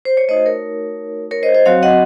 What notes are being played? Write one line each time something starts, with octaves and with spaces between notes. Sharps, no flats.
C5
C#5
A3 D#4 F#4 C5 D#5
A#4 C#5
A#4 C#5
C5 D#5
C5 D#5
F#3 C4 F#4 C#5 F5
D#5 F#5